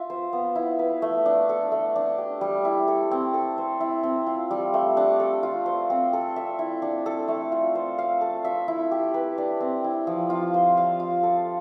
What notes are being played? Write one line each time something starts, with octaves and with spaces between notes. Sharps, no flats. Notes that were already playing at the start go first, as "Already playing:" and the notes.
Already playing: F4 E5
C5
B3
E4
B4
A3
D4
A4
A3
D4
G4
G3
E4
A4
C4
A4
C5
E4
C4
F4
G3
A3
D4
A4
F4
C5
C4
A4
E5
E4
D4
A4
A3
F4
C5
F5
A4
E5
E4
G4
B4
D4
C4
E4
F3
F4
C5
F5
F4
A4